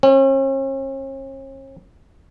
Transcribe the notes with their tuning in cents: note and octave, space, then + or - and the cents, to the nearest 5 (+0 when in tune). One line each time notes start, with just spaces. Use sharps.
C#4 -45